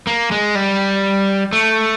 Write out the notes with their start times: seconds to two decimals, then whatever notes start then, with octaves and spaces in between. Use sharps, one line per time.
0.07 A#3
0.31 G#3
0.55 G3
1.53 A3